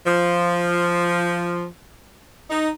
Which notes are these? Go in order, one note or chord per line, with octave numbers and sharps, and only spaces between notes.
F3
D#4